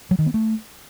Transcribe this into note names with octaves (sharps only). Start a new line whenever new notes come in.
F#3
D#3
B3
A3